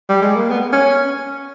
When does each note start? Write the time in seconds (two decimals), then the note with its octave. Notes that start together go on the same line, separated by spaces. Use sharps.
0.09 G3
0.22 G#3
0.36 A#3
0.50 B3
0.73 C#4